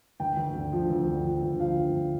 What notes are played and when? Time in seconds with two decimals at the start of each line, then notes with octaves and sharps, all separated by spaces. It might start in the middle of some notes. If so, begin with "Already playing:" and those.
0.20 D2 G5
0.37 D2
0.55 D3
0.72 F3
0.90 D2
1.07 D3
1.24 F3
1.43 D2
1.60 F3 F5
1.77 D2
1.95 D3